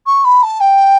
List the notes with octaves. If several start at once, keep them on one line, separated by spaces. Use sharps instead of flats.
C#6
B5
A5
G5